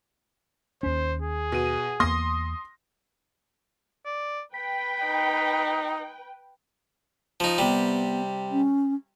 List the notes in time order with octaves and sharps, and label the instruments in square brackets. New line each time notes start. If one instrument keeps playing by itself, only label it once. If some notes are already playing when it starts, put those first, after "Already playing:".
[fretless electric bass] D#2 C#4 [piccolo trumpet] C5
[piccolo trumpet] G#4
[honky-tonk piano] B2 D#7
[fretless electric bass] E2 A#3 [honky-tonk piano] C6 D#6 A#6
[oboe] D5
[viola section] B4 G5 [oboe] B5
[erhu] D#4
[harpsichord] F3 D#4
[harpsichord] C3 G3 [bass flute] B3
[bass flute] C#4